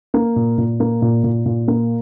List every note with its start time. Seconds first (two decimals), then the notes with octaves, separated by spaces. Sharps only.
0.14 A#3
0.36 A#2
0.58 A#2
0.80 A#3
1.02 A#2
1.24 A#2
1.46 A#2
1.68 A#3